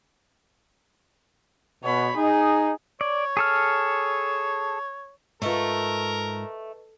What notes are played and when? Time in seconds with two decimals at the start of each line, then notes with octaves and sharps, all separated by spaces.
1.84 B2 C#5 B5
2.16 D#4 G#4
3.01 C#5 D5
3.37 G#4 A4 F6
5.42 G#2 A3 F4 A#4 B4 D#5 C#6